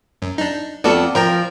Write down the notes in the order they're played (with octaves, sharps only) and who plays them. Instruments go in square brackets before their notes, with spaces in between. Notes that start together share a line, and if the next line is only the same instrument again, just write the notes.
[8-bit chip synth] F#2
D4 D#4
[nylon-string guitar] F2 D5 [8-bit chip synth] B3 F#4 A4
[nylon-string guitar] F3 [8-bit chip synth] A#4 G5 A#5